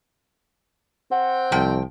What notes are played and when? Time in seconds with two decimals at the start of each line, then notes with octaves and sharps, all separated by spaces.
1.11 C4 F#5
1.52 C2 F3 G5